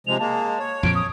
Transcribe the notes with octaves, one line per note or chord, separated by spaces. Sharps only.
C3 F3 G#3 F7
G#3 A#3 A5
C#5
F2 A#2 F3 D7
D#6